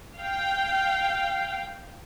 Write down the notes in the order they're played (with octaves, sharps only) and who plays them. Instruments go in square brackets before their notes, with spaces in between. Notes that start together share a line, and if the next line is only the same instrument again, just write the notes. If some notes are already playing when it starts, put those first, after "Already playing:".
[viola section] F5 G5